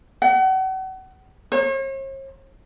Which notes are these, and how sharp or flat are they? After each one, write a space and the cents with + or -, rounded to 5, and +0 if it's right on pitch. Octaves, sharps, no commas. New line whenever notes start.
F#5 +35
C#5 -45